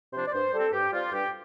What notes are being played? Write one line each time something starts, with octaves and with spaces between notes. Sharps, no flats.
C3 F3 D4 C5
D5
G2 C5
G3 C4 A4
G2 G4
G3 C4 F4
G2 G4